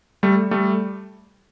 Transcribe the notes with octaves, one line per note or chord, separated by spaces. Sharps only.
G3 A3
G3 A3